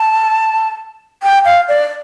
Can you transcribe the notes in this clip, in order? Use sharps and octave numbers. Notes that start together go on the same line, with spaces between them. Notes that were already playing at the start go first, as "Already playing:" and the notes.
Already playing: A5
G5
F5
D5